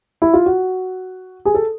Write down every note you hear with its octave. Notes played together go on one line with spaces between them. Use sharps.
E4
F4
F#4
G#4
A4